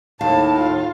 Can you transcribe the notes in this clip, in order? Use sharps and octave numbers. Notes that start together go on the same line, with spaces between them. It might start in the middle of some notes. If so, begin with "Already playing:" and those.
D#2 A2 F5 A5
F4